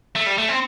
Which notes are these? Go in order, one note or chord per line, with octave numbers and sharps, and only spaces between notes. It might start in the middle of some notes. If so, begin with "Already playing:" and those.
A3
G3
A3
C4